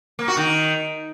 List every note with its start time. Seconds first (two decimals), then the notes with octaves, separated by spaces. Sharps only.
0.19 A#3
0.28 F#4
0.37 D#3